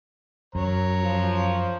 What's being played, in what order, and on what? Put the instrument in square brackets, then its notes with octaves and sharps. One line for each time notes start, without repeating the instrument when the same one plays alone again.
[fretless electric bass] F#2 [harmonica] C#5 A#5
[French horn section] F3